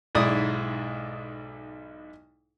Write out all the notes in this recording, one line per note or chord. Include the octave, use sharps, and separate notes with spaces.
B1 G#2 E4 D5 D#6